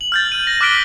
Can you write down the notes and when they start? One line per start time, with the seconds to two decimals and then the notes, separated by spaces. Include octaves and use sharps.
0.01 F#7
0.12 F6 G6 A6
0.32 D#7
0.47 A#6
0.61 D6 F6 F#6 B6 D7 G7